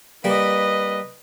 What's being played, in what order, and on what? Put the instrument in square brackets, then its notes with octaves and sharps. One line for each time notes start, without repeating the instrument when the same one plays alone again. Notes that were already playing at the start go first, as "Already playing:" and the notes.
[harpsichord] G3 A#3 [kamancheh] B4 D#5